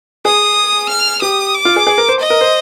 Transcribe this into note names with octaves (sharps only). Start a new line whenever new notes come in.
G#4 D#6
F6
G4 D#6
D6
F4
G#4
G#4
A#4
C5
D#5
A#4
C5